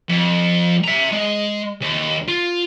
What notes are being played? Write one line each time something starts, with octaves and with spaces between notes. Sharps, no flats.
F2
E5 A#5
G#3
D#2
F4